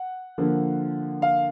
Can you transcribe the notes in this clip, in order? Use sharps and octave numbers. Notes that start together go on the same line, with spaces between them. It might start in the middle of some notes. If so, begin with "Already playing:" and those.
Already playing: F#5
D3 F3 A#3
F5